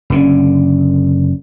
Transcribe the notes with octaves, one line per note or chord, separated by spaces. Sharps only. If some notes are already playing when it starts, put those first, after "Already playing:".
F#1 D3 C#4